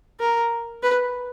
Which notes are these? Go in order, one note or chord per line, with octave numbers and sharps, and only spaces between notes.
A#4
B4